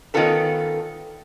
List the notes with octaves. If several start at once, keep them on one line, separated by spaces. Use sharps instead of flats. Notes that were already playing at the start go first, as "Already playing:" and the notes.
D#3 B3 C#4 F4 A4 B4